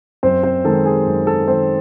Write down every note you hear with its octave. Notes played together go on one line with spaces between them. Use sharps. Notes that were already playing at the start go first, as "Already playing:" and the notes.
F#2 C4 C5
C4 C5
D#3 G#3 A4
G#4
F#2
A4
D#3 G#3 C4 C5